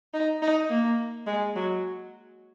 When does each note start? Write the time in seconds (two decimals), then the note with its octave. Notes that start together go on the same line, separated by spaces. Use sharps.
0.14 D#4
0.42 D#4
0.70 A#3
1.27 G#3
1.56 F#3